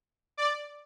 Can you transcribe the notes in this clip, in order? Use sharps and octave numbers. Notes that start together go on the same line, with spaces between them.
D5